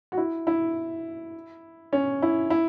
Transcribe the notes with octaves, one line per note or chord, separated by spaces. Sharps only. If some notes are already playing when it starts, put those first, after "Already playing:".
F#4
E4
E4
C#4
E4
E4